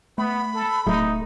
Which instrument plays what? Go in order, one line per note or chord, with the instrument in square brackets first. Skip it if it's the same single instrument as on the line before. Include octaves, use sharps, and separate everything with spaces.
[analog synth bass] A3 [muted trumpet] B3 [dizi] B5
[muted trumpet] A4
[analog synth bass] D1 [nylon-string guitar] A3 [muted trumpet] D#4